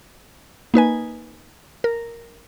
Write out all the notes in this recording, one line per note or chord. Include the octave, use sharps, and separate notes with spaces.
A#3 D#4 B4 G#5
A#4